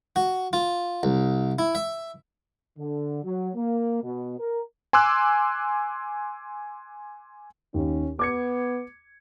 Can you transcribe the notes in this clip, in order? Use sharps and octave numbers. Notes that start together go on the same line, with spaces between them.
F#4
F4
C2
E4
E5
D3
F#3
A#3
B2
A#4
G#5 C6 D6 E6 F#6
D#2 C#4
B3 D6 G#6 C#7